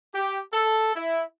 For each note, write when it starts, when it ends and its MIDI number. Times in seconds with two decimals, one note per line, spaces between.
0.14 0.39 67
0.53 0.93 69
0.96 1.24 64